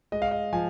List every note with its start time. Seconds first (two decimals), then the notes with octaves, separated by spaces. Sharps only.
0.12 G#3 D#5
0.22 F5
0.31 D#5
0.53 F3 G#5